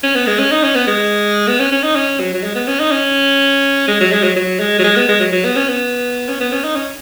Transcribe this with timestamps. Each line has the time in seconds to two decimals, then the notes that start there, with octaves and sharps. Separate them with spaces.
0.03 C#4
0.15 B3
0.27 G#3
0.39 C#4
0.52 D#4
0.64 C#4
0.75 B3
0.87 G#3
1.47 B3
1.59 C#4
1.72 C#4
1.83 D#4
1.96 C#4
2.20 F#3
2.34 F#3
2.44 G#3
2.55 B3
2.68 C#4
2.80 D#4
2.92 C#4
3.88 G#3
4.00 F#3
4.12 G#3
4.23 F#3
4.36 F#3
4.60 G#3
4.79 F#3
4.84 G#3
4.96 B3
5.08 G#3
5.20 F#3
5.32 F#3
5.45 B3
5.56 C#4
5.69 B3
6.28 C#4
6.40 B3
6.52 C#4
6.64 D#4
6.76 C#4